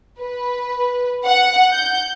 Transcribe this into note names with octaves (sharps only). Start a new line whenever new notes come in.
B4
F#5
G6